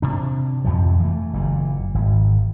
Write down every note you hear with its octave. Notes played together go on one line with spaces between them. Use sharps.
C3 D4
F2 C3 F3
E3 A3
F#1 A#2
G#1